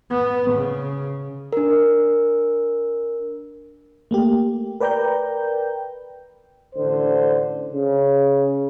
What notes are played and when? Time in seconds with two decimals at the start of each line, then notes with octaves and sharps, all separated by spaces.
0.11 B3
0.52 C#3
1.53 D4 A#4
4.11 A3 A#3 G4
4.80 A#4 B4 D5 G5 A#5 G6
6.75 A1 D3 C5
7.73 C#3